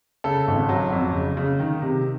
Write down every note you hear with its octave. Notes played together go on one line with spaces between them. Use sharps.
C#3 A4
G#1
F#3
F2
C#3
C#3
D#3
C3